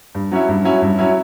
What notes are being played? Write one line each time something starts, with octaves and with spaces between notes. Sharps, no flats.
G2
F#3 C#4 E4
G2
F#3 C#4 E4
G2
F#3 C#4 E4